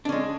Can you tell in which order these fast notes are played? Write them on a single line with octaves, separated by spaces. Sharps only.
D4 C#4 G#3